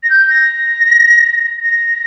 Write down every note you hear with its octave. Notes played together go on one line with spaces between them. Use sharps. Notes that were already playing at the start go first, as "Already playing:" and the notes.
A#6
G6
A#6
A#6